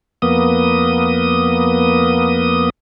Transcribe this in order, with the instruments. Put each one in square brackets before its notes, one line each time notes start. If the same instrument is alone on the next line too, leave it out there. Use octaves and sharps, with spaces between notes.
[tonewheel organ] F2 A#3 B3 D#6